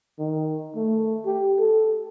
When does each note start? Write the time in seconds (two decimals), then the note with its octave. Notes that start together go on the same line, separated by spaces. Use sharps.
0.19 D#3
0.76 A3
1.26 G4
1.59 A4